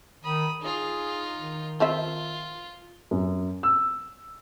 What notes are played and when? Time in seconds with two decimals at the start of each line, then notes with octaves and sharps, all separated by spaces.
0.24 D#3 B5 D#6
0.62 D#4 F4 G#4
1.37 D#3
1.80 F3 C4 F4 E5
3.11 F#2
3.63 E6